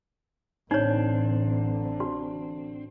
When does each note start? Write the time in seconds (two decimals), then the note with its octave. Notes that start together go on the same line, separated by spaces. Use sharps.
0.71 A1 D3 C4 D4 D#4 C#5
2.00 F#4